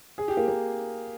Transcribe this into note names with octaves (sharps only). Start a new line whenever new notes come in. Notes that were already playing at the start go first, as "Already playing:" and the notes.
G#4
G4
A#3
A#3